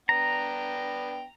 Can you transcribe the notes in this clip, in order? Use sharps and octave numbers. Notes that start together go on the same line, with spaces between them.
B3 D4 G5 A#5